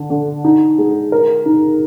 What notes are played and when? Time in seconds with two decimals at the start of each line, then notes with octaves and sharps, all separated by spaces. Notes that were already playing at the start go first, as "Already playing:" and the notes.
Already playing: D3
0.10 D3
0.44 D#4
0.78 G#3
1.12 A#4
1.46 D#4